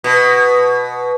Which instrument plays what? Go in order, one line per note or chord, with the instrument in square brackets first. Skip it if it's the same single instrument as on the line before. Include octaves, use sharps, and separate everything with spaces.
[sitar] B2